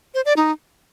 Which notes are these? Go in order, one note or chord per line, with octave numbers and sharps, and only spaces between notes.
C5
D5
D#4